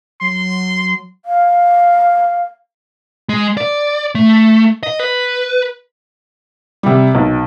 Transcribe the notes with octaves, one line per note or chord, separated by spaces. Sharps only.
F#3 C6
F5
G#3
D5
A3
D#5
B4
C3 G3
B1